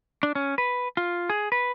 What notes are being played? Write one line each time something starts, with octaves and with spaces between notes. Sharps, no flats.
D4
C#4
B4
F4
G#4
B4